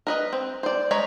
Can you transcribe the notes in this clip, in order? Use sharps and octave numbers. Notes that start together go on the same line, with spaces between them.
A#4 B4 D#5
C4
C5 D5
G#3 C#5 A#5 B5